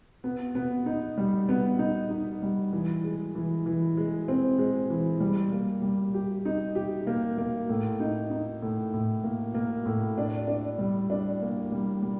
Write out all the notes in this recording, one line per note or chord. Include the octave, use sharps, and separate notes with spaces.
B3
B3
D#4
G3
B3
D#4
D#4
G3
E3
G#3
E3
E3
G#3
C4
G#3
E3
G3
A#3
G3
G4
D#4
G4
A#3
A#3
A2
D#4
D#4
A2
A2
A#3
A#3
A2
D4
D4
G3
D4
A#3
G3
G3